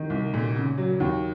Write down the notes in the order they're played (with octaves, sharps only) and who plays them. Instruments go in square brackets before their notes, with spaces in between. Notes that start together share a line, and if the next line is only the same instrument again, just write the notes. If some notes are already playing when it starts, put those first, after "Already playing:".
Already playing: [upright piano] D#3
C2
A#2
C#3
F#3
D#2